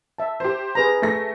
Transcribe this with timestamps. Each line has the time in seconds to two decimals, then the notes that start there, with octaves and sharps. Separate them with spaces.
0.18 E5 A5
0.40 G4 C5
0.75 G#4 B4 A#5
1.02 A3 A#6